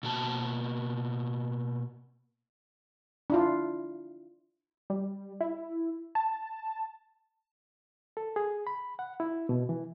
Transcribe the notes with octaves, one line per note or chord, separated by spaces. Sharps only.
B2 A#3 F#4 A5
D4 E4 F4
G3
E4
A5
A4
G#4
B5
F#5
E4
B2
E3